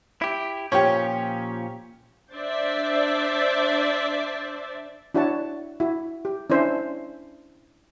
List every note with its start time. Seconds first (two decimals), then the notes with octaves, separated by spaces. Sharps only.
0.22 E4 G4
0.72 A#2 F3 C#4 G4 C#5
2.33 D4 C5 D5 E5 A5
5.14 D4 E4 F#4 C#5 F#5 A5
5.80 E4 F#4
6.25 G4
6.50 C#4 D4 E4 C5 E5